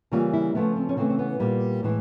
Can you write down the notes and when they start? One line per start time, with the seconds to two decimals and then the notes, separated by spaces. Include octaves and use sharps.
0.12 C#3 E3 G3 A#3 F4
0.33 E4
0.55 C#3 F3 A3 B3
0.76 C4
0.89 C#4
0.97 C#3 E3 A3 C4
1.10 C4
1.19 B3
1.39 A#2 G3 A#3
1.83 A2 E3 G#3